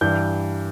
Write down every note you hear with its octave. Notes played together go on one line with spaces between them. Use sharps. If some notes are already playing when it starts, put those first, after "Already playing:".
G2 E3 G3 G6